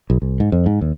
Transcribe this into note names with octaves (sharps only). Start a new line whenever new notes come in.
B1
C2
G#2
F2
G#2
D#2